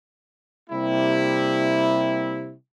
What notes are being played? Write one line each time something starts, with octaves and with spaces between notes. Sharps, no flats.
C3 G3 A#3 E4